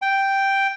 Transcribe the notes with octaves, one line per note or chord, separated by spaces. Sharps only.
G5